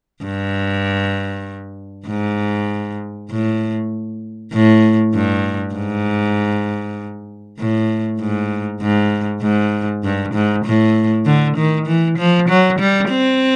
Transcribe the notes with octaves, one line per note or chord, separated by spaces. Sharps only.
G2
G#2
A2
A2
G2
G#2
A2
G#2
G#2
G#2
G2
G#2
A2
D3
D#3
E3
F3
F#3
G3
C4